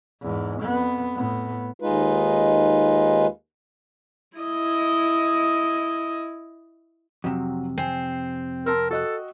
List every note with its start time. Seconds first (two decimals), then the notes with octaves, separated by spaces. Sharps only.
0.23 E2 G#2
0.63 F2 B3
1.16 A2 B3
1.80 D#2 G#3 D#4 F4 B4
4.38 E4 D#5
7.24 F2 C3 F#3
7.78 C4 G#5 C7
8.66 A#4 A5 C6 E6
8.91 F#4 A4 D#5 F#6